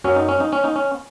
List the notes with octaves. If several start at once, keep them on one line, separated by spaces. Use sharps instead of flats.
F#2 F#3 C#4
D#4
C#4
D#4
C#4
D#4
C#4